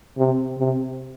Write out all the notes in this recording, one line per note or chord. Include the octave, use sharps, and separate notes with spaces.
C3
C3